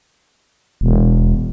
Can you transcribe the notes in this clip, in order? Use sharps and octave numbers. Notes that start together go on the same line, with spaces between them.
E1